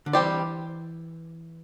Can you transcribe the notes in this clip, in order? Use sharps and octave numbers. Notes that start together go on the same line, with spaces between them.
D3
E3 G3 C4 G4 D5